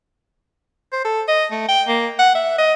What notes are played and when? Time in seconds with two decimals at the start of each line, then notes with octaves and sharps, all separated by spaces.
0.92 C5
1.04 A4
1.28 D#5
1.51 A3
1.68 G5
1.88 A#3
2.19 F#5
2.35 E5
2.58 D#5